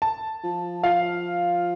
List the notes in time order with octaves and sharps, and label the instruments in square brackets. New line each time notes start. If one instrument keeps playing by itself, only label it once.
[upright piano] A5
[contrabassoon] F3
[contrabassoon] F3 [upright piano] F5